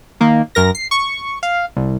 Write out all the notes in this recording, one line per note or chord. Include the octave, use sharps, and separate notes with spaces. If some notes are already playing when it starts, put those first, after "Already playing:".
D#3 A#3
F#2 A#4 A#6
C7
C#6
F5
C2